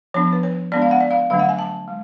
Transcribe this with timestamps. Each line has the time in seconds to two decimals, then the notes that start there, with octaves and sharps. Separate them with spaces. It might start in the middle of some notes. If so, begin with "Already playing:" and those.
0.14 F3 B3 D4 C#5
0.33 B4
0.43 C#5
0.72 G#3 B3 D4 D5
0.82 F5
0.91 F#5
1.00 D5
1.11 F5
1.30 D3 F#3 A3 D4 F5
1.39 F#5
1.49 G#5
1.59 A5
1.88 G#3